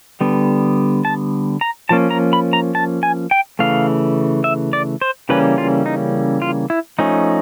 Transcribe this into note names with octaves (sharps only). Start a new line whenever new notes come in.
D3 G3 B3
A5
A#5
F3 A#3 C#4 A5
A#5
B5
A#5
A5
G#5
G5
C#3 E3 A3 F5
E5
D5
C5
C#3 E3 G3 A#3 C#4 B4
F4
D#4
F4
E4
F3 A3 C#4 D#4